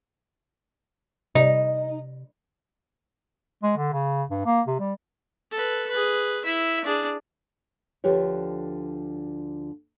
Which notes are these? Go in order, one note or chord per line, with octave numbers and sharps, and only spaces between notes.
C3 D#4
G#3
D3
C#3
G2
A#3
C3
G3
A4 B4
G#4 B4
E4 E5
D4 G#4
D2 D3 F3 G4 B4 C#5